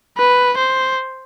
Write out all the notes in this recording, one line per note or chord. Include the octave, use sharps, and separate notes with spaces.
B4
C5